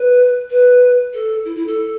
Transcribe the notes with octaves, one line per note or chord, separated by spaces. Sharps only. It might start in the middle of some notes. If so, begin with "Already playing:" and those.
Already playing: B4
B4
A4
E4
E4
A4